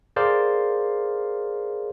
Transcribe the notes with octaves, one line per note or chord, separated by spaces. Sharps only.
G#4 A#4 C5 D5 F5